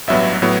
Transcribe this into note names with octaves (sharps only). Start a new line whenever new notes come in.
A1 G2 F#3 B3 E5
A2 F#3 B3